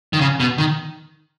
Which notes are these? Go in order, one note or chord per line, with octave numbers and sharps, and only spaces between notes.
D#3
C#3
B2
D#3